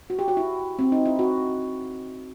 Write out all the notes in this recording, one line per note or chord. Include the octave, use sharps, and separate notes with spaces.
F#4
G4
F#4
E4
C4
D#4
E4
F#4